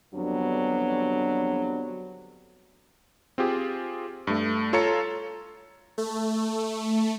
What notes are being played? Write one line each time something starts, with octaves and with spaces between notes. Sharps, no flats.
F2 D3 F#3 G3 B3 D4
C4 F4 G4 G#4
G2 A3
F4 A4 C#5 A#5 C#7
A3